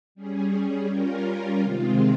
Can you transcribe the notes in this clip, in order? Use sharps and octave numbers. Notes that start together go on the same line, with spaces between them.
G3 C#4 G#4
G3 C#4 F4 A#4
C3 D#3 G#3 C4 F4